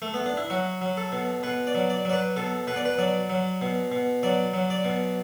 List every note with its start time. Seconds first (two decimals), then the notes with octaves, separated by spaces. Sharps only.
0.02 A3
0.14 B3
0.26 D4
0.37 E4
0.50 F#3 F#4
0.81 F#3
0.97 A4
1.12 B2
1.43 B2 B4
1.67 D5
1.75 F#3
1.90 D5
2.05 F#3 D5
2.13 B4
2.36 B2 A4
2.67 B2 B4
2.76 D5
2.85 B4
2.98 F#3 D5
3.30 F#3
3.62 B2
3.92 B2
4.23 F#3 D5
4.54 F#3
4.70 D5
4.85 B2